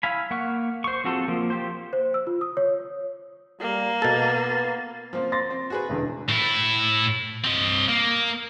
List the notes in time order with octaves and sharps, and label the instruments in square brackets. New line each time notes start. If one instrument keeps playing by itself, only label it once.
[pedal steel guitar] E4 F5 G#5 B5
A#3 F#5 C#6 F6
C5 C#6
F3 C4 F#4 G#4 A4
F3 A#3
F4 G4 C5
[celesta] C5
E6
F4
D#6
C#5
[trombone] G3 [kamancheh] A#3
[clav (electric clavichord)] B2 A4 [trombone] B3 [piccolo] A6
[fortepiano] F3 A#3 C4
[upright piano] C6 A6 A#6
[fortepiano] C4
F#4 G#4 B4
[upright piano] E1 E2 D3
[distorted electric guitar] A2 E4
C4 D#5
A#3